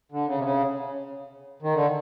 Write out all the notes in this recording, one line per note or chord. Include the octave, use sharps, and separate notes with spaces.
D3
C#3
C3
C#3
D#3
D3